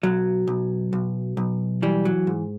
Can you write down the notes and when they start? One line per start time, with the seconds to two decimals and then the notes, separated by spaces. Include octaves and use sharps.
0.03 B1 F#3
0.47 B1
0.93 B1
1.37 B1
1.82 E3 G3
2.05 F#3
2.27 G#2